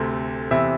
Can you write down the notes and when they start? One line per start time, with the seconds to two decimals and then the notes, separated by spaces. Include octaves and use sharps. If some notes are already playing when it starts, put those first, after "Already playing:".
Already playing: D2 C3 A3 C4
0.51 E2 C3 E3 E5